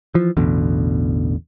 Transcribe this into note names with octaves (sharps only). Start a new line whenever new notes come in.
E3 F3
A1 E2 B2 D3